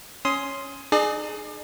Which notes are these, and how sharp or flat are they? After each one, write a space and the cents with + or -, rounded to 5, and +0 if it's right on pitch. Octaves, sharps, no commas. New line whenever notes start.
C#4 +0 C6 +0 D#6 +20
D#4 -40 G#4 +20 D5 +40